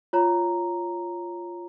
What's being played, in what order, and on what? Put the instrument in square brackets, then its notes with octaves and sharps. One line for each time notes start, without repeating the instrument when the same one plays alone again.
[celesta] F4 C#5 A#5